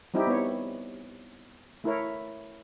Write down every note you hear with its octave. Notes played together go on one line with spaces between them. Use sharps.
G3 C4 D#4 E4 G4
B3 C#5
A3 E4 A#4 C#5